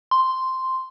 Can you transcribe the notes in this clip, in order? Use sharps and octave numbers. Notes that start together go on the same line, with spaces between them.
C6